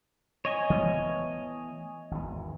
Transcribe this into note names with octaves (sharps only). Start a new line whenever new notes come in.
C#5 D#5 G#5
E3 A3 B3
G#1 E2